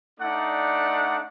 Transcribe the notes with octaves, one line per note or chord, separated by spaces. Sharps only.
A3 D4 D#4 D5 F#5